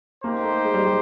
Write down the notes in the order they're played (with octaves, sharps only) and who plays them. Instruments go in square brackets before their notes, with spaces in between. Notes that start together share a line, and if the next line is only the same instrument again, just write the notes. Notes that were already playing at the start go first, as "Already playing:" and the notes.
[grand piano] A#3 [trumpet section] D#4 G4 C5
[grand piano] A3
G#3
G3
G3